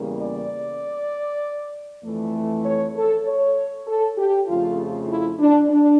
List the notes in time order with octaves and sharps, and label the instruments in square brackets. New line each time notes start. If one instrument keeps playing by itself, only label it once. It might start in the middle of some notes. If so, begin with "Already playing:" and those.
Already playing: [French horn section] E2 C#3 G3 A#3
D5
F2 E3 A3
C#5
A4
C#5
A4
G4
F2 C#3 F3 A3 F4
E4
D4
D4